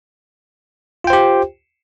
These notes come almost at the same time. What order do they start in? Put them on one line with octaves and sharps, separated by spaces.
F4 G5 C5 G4